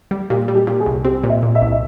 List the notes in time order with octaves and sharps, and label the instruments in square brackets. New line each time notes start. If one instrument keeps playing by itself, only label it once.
[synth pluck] G3
[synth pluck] A#2 [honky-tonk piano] G4
[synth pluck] G3
[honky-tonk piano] G4
[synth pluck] A#2
[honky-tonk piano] G#4
[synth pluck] C2
[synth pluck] C4 [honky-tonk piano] G4
[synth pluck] A#2
[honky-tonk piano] E5
[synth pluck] A#2
[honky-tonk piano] E5
[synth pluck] C2
[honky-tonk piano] E5